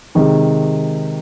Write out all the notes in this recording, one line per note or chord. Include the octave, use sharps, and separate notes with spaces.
C3 D#3 G#3